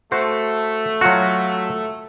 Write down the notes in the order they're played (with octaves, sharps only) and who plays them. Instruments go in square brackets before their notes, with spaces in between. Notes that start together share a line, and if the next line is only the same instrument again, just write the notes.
[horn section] A3 [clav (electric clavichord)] F#4 C5
[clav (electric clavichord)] F#3 F4 F#4